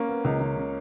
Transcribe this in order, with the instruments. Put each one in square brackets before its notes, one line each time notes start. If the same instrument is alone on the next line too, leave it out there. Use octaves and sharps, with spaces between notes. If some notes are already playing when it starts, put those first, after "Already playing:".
Already playing: [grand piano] A#3 C#4
[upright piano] B3
C#2
C#2
C#3